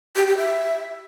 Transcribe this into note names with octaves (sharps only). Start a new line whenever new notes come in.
G4
G4
E5